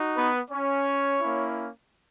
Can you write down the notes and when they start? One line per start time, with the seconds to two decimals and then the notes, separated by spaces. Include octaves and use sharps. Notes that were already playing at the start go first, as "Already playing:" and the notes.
Already playing: D#4 F#4
0.17 B3 B4
0.51 C#4 C#5
1.21 A#3 C#4 E4